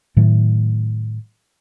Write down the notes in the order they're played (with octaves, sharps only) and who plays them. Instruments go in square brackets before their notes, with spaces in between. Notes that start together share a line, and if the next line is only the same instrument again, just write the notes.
[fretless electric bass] A2 D#3 F#3 A3